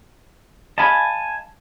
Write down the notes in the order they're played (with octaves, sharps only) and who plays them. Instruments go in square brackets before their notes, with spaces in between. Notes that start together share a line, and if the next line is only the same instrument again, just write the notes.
[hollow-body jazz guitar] D#5 F5 B5 [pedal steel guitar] G#5 A5